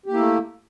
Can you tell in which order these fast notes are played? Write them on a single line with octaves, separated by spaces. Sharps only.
G4 A#3 E4 A3